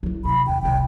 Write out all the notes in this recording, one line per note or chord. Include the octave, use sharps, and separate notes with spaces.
F#3 E4
C3 B5
D#2 G5
F1 C2 G5